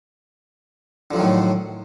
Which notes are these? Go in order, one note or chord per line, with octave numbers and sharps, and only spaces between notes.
A2 D3 D#3 F3 F#3